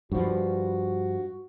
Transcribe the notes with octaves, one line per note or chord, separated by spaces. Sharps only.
G2 F3 F#4